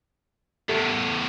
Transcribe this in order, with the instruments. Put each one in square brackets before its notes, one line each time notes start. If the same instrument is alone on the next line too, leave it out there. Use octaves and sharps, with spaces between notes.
[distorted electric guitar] E2 A2 [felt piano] A4 E5